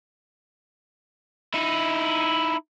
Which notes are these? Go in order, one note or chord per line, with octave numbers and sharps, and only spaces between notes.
D#4 E4